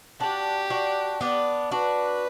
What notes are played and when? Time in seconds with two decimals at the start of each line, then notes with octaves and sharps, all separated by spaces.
0.20 D4 F#4 G4
0.70 D4 F#4
1.21 B3 D4
1.71 D4 F#4 B4